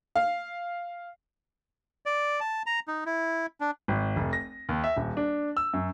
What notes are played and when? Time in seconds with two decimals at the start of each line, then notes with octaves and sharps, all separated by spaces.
0.16 F5
2.06 D5
2.40 A5
2.66 A#5
2.88 D#4
3.06 E4
3.61 D4
3.88 G#1
4.16 F1
4.33 A#6
4.69 D#2
4.84 E5
4.97 D#1
5.17 D4
5.57 E6
5.73 F#2